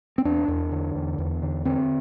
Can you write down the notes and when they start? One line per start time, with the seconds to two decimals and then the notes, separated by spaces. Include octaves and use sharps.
0.18 C4
0.25 E2 D4
0.48 E2
0.72 D3
0.95 E2
1.18 E2
1.42 D3
1.65 D3 C4